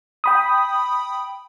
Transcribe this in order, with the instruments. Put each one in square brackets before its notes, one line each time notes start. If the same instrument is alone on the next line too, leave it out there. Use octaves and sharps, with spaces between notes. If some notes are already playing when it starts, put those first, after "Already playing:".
[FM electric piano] G5 B5 D#6